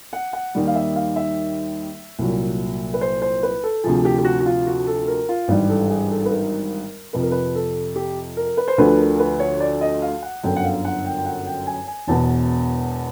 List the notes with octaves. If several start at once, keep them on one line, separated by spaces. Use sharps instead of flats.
F#5
F#5
D#2 D#3 G3
F5
E5
F5
E5
C2 A#2 F#3
B4
C5
C5
B4
A4
D2 C3 F3 G#4
G4
G4
F#4
F#4
F4
F#4
A4
A#4
F4
G#1 G2 E3 G3
A4
G#4
A4
B4
A#4
F2 C3 F3 B4
A#4
B4
A4
G4
A#4
B4
C5
D2 D3 F3 B4
A#4
B4
C#5
D5
D#5
F5
F#5
G1 F#2 D3 G5
F#5
F5
F#5
G5
G5
F#5
G5
G#5
G#5
E1 E2 B2 A5